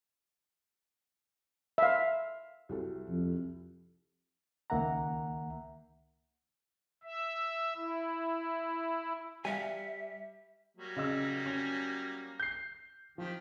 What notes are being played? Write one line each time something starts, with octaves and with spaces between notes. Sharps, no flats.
E5 F5
C2 F#4 A4
F2
C#2 D#3 A#3 E5 F#5 A#5
E5
E4
G3 E5 F5 G#5 C#7
F#3 G3 A#3
C#3 D#5 E6
C#4
G6 C7
D#3 F3 G4